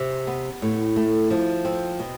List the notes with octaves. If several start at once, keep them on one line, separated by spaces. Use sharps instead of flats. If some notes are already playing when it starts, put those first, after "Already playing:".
Already playing: C3
B3
A2
A3
F3
C4
B2